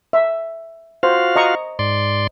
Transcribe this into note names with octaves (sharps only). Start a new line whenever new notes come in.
E5
F4 F#4 C5 F5
D#5 A#5 C#6
G#2 D5 C6